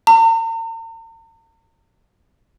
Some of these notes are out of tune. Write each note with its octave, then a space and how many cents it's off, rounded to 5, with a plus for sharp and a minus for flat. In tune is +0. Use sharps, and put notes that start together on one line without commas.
A#5 -45